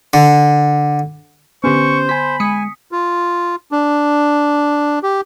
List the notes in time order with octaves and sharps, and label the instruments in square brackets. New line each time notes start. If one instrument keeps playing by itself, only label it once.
[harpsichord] D3
[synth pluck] D3 B3 [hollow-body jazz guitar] C#4 G4 B4 [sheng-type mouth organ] C5 [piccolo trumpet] C#6
[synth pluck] G#5 B6 [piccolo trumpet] B5 [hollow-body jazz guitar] C6
[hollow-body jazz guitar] G#3 [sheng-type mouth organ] G#5 [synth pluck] D#6 B6 C#7
[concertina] F4
D4
G4